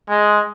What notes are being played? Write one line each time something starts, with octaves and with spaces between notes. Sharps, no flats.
G#3